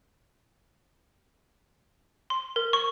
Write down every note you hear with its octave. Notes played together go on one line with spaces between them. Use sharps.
C6
A#4
C#6